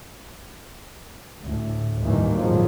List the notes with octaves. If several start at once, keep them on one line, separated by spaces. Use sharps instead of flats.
D2 A2
G1 D#2 A2 D#3 E3 G3
G#1 F2 A#2 F3 F#3